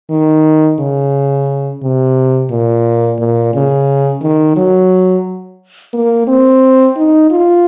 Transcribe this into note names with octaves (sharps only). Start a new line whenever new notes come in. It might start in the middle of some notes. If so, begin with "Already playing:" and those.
D#3
C#3
C3
A#2
A#2
C#3
D#3
F#3
A#3
C4
D#4
F4